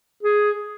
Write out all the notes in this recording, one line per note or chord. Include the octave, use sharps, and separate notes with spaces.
G#4